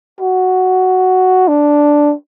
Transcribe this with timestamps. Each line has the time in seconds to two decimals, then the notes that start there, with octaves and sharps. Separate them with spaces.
0.21 F#4
1.48 D4